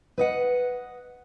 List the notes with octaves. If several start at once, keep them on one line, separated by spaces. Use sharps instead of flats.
B4 D#5 F#5